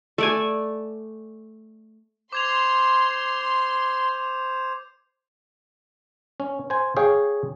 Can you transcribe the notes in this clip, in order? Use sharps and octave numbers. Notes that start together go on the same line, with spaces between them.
A3 D5 G#5
C5 C6 D6 G#6 F7
C#4
C5 G#5
G#4 C#5 F5 G5